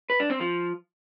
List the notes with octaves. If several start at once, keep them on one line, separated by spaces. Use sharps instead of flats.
B4
D4
C4
F3